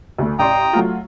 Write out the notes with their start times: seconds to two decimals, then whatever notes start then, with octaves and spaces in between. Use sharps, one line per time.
0.18 D2 A3
0.39 A1 D5 G5 A#5 C6 D#6
0.73 F#3 A3 F4